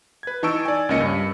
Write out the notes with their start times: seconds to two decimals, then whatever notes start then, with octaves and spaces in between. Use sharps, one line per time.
0.23 B4 G#6
0.43 E3 D#4 A5 C#6 E6 D7
0.65 D5 G#5
0.89 C#2 A#3 C#4 D#5 C#7
1.00 G2